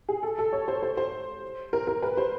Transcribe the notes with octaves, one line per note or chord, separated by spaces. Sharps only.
G#4
A4
A4
C#5
C5
C5
C5
A#4
A#4
B4
C5